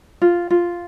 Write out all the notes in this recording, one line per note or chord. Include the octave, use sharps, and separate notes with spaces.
F4
F4